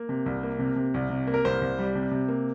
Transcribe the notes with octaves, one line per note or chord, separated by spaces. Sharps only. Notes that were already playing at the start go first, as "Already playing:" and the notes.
Already playing: A#3
C3
C2
A#3
C3
C3
C2
C3
A#3
A#4
C2 C5
C2
G3
C3
C3
A#3